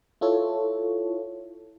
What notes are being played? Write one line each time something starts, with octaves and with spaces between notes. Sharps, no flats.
E4 F4 A4 C#5